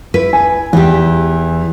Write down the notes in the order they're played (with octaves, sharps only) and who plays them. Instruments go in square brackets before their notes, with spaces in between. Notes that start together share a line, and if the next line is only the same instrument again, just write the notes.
[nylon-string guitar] E4 B4
[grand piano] G#5
[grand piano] E2 [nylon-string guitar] E3 G4